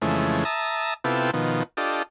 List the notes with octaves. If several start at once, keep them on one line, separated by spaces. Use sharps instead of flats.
F2 C#3 E3 G#3 A3
E5 A5 A#5 D#6
C3 B3 E4 F4 G4 A4
B2 D#3 F3
D4 F4 G4 A4 D#5